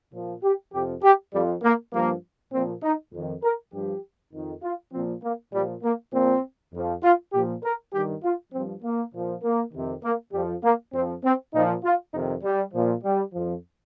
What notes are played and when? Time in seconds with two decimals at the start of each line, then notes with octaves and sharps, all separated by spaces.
0.13 A#2 F3
0.43 G4
0.73 F2 C3 F3 G4
1.03 G4
1.33 F2 F3 G3
1.63 A#3
1.93 G2 F3 A#3
2.52 A#2 F3 C4
2.83 D#4
3.13 F2 D#3
3.43 A#4
3.73 G2 F3 G4
4.33 F2 D#3
4.63 F4
4.93 A#2 F3 C4
5.23 A#3
5.53 A#2 F3 G3
5.83 A#3
6.13 A#2 F3 C4
6.73 F2 F3
7.03 F4
7.33 A#2 F3 G4
7.63 A#4
7.93 G2 D#3 G4
8.23 F4
8.53 G2 F3 C4
8.83 A#3
9.13 A#2 F3
9.43 A#3
9.73 F2 C3 D#3
10.03 A#3
10.33 F2 F3 G3
10.63 A#3
10.93 F2 F3 C4
11.24 C4
11.53 A#2 F3 D#4
11.84 F4
12.13 F2 C3 D#3 D#4
12.43 G3
12.74 A#2 F3
13.03 G3
13.33 F2 F3